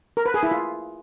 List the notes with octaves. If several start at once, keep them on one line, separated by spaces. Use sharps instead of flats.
A#4
B4
G#4
E4
F4